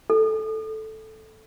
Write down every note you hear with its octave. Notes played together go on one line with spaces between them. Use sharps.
A4